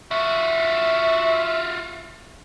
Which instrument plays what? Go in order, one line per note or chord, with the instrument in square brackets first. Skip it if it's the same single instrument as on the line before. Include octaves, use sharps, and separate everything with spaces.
[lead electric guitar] F4 F#4 [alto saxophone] E5